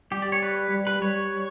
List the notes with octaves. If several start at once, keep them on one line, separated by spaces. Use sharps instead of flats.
G3 G4
D5
C#5
B4
G3
B4
G3 C#5